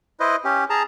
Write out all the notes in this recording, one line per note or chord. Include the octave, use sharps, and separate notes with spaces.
E4 B4 C5 D#5
C#4 G4
G#4 A5 A#5